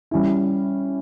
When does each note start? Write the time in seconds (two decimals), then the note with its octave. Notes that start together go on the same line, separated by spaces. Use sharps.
0.11 G3 C#4 E4